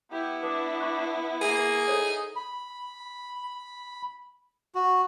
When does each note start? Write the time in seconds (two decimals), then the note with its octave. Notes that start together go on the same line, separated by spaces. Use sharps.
0.12 B3 E4 G4
0.43 D4 B4 D6 D#6
0.80 B5 C#6 F#6
1.42 A#3 G#4
1.87 D#4 A4 C5 C#5
2.36 B5
4.75 F#4